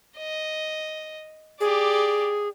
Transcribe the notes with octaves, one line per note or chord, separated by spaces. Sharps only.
D#5
G4 G#4 D5